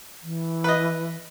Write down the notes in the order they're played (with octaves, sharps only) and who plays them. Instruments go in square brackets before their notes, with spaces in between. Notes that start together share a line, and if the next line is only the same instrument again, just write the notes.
[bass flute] E3
[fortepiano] B4 D#5